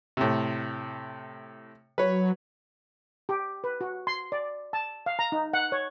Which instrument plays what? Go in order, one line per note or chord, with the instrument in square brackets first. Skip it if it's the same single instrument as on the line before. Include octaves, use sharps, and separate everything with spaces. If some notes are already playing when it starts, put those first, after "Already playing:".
[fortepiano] A2 C3
[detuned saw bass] F#3 [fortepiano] B4 C#5
[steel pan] G4
B4
F#4
C6
D5
A5
F5
A#5
D#4
F#5
C#5